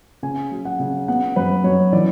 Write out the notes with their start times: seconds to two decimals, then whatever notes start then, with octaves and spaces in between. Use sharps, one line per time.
0.23 C#3 G#5
0.51 F#3
0.65 F#5
0.80 C#3
1.08 B3 F#5
1.36 F#2 B4
1.64 F#2 C#5
1.93 E3 D5